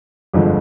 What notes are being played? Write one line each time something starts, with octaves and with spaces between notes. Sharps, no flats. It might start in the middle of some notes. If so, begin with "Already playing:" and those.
G1 F2 D3 F3 G#3